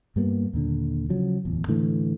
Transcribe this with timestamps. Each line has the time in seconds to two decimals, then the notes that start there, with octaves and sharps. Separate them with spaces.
0.16 G2 G3 A#3 B3
0.53 D#2 A#2 D3
1.09 C#3 F3 F#3
1.45 D1 E2
1.68 A2 D3 E3 A3